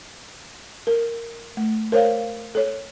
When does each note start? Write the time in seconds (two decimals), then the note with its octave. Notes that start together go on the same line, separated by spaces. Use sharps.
0.87 A#4
1.57 A3
1.92 A#4 C5 C#5 F5
2.55 A4 C#5